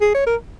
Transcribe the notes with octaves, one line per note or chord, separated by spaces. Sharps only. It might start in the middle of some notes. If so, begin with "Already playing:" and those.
G#4
C#5
A#4